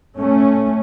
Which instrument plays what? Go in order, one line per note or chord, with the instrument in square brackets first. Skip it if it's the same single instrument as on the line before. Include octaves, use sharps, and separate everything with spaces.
[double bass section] A3 C#4